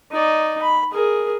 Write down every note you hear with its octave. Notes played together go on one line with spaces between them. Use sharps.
D#4 D5
B5
G#4 A#4